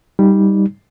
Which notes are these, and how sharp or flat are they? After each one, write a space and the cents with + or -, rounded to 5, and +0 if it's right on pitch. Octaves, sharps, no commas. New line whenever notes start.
G3 +0 D#4 +10